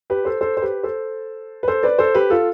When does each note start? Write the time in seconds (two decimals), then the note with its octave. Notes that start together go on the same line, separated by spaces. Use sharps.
0.10 G4 B4
0.25 A4 C5
0.41 A4 C5
0.57 C5
0.62 G4 B4
0.83 A4 C5
1.63 B4
1.68 A4 C5
1.83 B4 D5
1.99 A4 C5
2.15 G4 B4
2.30 F4 A4